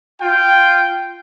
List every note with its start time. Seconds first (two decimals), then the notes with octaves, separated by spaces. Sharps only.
0.21 F4 G5